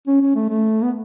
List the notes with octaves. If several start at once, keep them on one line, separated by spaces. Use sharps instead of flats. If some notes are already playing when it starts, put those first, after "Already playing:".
C#4
C#4
A3
A3
B3